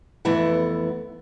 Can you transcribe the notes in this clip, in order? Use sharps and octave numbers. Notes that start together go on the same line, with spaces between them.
F2 E3 A3 B3 E4 F#5